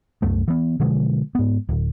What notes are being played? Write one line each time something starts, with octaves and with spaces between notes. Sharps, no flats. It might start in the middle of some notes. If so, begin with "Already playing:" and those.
C2 F#2 A3
E3 B3
B2 D3 F3 G#3
G#2 B3
D1